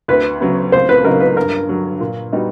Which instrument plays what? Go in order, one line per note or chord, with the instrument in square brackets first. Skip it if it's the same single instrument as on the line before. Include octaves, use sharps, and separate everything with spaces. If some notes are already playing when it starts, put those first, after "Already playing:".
[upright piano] D2 [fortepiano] B4
[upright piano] C#3 F#3 B3
[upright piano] C#2 [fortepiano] C5
[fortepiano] B4
[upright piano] C#3 F#3 A#3 D#4 [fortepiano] A#4
[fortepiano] B4
[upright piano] G2 [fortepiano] A#4
[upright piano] D3 F#3
A#2
G3 B3 D#4 F#4